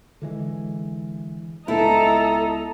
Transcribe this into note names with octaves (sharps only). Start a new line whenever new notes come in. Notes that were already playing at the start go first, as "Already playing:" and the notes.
D3 E3 G#3
C#2 G#3 B3 E4 A4 D#5 A#5